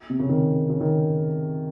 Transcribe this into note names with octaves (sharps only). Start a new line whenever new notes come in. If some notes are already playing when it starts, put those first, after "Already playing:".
C3
C#3
D#3
C#3
D#3